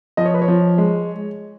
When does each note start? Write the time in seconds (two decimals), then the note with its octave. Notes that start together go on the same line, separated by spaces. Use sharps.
0.17 F3 D#5
0.25 C#5
0.34 B4
0.42 C#5
0.48 F3
0.78 G#3